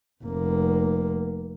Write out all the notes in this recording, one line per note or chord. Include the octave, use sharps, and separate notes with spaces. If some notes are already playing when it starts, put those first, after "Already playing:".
F1 A#3